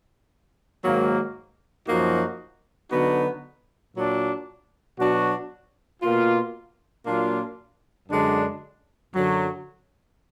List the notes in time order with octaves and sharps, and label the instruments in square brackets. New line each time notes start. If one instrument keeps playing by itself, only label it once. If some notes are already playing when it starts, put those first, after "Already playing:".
[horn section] G#2 D#3 F#3 A#3
F#2 F3 A#3 D#4 F#4
D3 F#3 B3 D#4 F#4
A#2 F#3 D4
B2 F#3 D4 F#4
B2 A#3 F4
A#2 F#3 A#3 D4 F4
F#2 D3 G#3 D4
F#2 D3 F#3